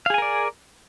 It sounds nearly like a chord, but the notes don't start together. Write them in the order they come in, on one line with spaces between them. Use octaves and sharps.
F5 G#4 G#5 A#4 D5